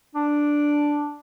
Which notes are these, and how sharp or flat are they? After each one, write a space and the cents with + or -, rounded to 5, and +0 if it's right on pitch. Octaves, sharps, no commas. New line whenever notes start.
D4 +0